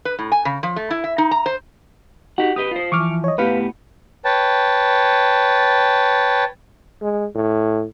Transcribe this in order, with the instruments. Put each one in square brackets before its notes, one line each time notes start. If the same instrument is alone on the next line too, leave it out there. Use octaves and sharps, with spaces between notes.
[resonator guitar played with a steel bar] B4
A2
G#5
C#3
F3
A3
E4
E5
D#4
A#5
C5
[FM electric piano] D#4 F#4 [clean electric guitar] G4 F#5
[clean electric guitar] G4 B4 D#5 [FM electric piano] D#6
[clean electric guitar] F4 C5
[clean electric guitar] E3 F3 [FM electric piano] C#6 D6 F6
[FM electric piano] C#5 D#5
[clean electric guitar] A2 B3 G4 [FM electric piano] B4 F5
[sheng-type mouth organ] B4 C#5 G5 A5
[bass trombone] G#3
A2